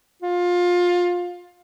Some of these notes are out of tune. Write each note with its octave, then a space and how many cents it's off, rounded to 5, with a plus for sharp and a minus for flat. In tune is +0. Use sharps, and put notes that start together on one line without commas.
F4 +20